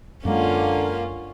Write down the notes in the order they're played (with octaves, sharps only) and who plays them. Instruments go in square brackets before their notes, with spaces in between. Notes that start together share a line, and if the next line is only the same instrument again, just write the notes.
[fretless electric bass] F#2 G#3 [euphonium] D3 [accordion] A#3 [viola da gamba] C#4 F4